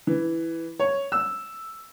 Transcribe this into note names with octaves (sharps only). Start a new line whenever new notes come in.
E3
C#5
E6